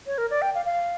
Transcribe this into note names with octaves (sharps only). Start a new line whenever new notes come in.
C#5
A#4
D5
G5
F5
F5